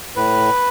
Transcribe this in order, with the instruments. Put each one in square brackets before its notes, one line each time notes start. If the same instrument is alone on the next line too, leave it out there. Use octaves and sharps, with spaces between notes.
[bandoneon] A2 B4